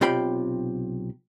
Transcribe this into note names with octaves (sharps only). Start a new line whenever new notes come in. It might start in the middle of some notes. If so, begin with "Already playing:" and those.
B1 C3 F4 G5 B5